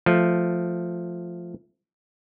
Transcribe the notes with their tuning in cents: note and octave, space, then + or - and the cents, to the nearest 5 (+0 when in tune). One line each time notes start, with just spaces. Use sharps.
F3 +0 A3 +0